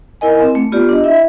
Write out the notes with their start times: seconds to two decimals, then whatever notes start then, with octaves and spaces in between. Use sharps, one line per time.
0.21 E4 A#4 D#5 G#5
0.42 C4
0.55 A3
0.72 B3 F4 G4 D5
0.89 D4 D#5
1.04 E4 E5